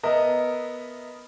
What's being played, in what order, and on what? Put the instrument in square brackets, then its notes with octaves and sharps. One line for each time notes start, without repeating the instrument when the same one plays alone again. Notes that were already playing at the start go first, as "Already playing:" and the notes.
[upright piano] B3 A#4 D#5 E5